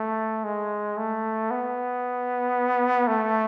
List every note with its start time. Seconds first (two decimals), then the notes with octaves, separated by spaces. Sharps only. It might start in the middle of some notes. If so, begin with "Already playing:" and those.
Already playing: A3
0.44 G#3
0.97 A3
1.51 B3
3.08 A3